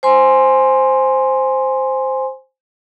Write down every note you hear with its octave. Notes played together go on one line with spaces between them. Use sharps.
C5 G#5 C6